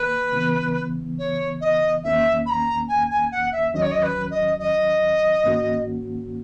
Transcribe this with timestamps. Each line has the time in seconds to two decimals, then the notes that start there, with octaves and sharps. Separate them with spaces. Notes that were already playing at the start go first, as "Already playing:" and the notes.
Already playing: D#3 A#3 B4
0.33 C#3 E3 B3
1.19 C#5
1.61 D#5
2.03 E2 D#3 A#3 C#4 E5
2.46 B5
2.50 A#5
2.88 G#5
3.10 G#5
3.32 F#5
3.52 E5
3.74 D#2 D#3 F#3 C#4 D#5
3.82 C#5
3.91 D#5
4.03 B4
4.31 D#5
4.59 D#5
5.44 G#2 D#3 A#3 C#4 F#4